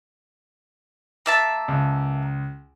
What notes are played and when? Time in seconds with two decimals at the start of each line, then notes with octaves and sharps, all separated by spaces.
1.26 A#3 E5 A5
1.68 C#2